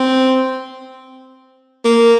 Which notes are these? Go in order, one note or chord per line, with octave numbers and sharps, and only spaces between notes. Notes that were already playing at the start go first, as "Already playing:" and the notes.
Already playing: C4
A#3